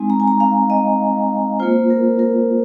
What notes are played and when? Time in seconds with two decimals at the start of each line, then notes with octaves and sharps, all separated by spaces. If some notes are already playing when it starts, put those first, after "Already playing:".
Already playing: G#3 C4 D#4 G#5
0.10 A#5
0.20 G#5
0.28 A#5
0.40 F5
0.70 D#5
1.60 A#3 F4 C5
1.90 A#4
2.19 A#4